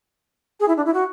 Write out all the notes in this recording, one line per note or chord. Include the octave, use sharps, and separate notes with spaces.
G#4
E4
D4
E4
F#4